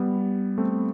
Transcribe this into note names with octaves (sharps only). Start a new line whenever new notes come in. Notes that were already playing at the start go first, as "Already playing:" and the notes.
Already playing: G3 B3
A3 C4